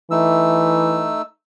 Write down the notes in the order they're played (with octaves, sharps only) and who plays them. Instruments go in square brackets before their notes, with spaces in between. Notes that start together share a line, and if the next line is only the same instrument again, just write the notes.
[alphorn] E3 [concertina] A3 D#4 E6